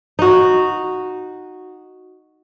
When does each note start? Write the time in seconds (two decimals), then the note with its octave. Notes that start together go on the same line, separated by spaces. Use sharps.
0.19 D#4 F#4